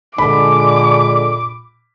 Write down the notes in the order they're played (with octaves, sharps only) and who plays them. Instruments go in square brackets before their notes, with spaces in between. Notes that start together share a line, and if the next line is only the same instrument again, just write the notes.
[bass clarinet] A#2 [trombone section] D3 G#3 [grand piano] B5 [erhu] D6